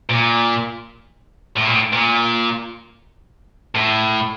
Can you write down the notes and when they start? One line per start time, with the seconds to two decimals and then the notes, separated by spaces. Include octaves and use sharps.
0.10 A#2
1.56 A2
1.65 A#2
1.73 A2
1.93 A#2
3.75 A2